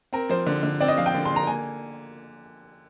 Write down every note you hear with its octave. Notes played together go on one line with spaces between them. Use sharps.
C4 A#4
F3 C5
D3
D3
C4 D5
D#5
F3 F5
G5
D3
C6
D3
A#5
A#3 G#5